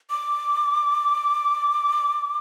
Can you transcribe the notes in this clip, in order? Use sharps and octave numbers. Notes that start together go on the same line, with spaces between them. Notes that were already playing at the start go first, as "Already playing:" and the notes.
D6